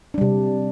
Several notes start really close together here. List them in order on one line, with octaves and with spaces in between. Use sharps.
D4 G3 C3